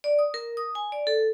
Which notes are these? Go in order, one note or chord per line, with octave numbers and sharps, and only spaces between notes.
D5
D#6
A#4
D#6
G#5
D5
A4